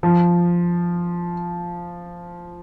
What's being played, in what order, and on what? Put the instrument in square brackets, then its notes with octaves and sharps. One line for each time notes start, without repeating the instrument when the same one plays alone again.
[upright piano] F3